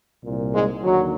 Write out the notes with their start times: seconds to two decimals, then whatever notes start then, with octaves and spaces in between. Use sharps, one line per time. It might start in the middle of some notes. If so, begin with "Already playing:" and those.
0.23 C2 A#2
0.53 G#2 G#3
0.83 D#2 D3 F#3